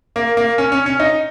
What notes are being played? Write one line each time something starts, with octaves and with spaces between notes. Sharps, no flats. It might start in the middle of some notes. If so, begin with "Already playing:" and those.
A#3
A#3
C#4
C#4
C#4
D#4